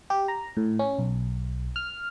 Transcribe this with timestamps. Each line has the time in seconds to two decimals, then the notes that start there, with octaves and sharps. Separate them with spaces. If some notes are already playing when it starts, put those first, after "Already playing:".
0.10 G4
0.28 A#5
0.57 A2
0.79 C#4
0.99 B1
1.76 F6